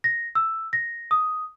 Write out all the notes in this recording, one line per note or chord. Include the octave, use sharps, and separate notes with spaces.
A#6
E6
A#6
D#6